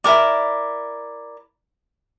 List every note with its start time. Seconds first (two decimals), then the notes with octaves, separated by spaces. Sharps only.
0.04 E4 A4 A#4 D5